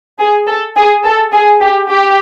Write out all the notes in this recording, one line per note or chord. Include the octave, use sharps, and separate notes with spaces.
G#4
A4
G#4
A4
G#4
G4
G4